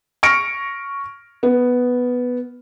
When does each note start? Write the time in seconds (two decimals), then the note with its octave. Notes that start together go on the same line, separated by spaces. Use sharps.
0.23 C#6 F6 A#6 C#7 D7
1.43 B3